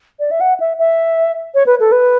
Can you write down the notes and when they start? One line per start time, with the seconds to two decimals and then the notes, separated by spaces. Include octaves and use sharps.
0.19 D5
0.31 E5
0.40 F#5
0.60 E5
0.79 E5
1.54 C#5
1.66 B4
1.80 A4
1.92 B4